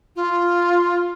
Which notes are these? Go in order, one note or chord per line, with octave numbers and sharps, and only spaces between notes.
F4